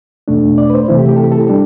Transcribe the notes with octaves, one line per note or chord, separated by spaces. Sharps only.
E2 B2 A3 D4
D5
B4
C5
C3 E3 A3 C4 E4
G4
G4
A4
G4
A4
G4
G3 D4 A4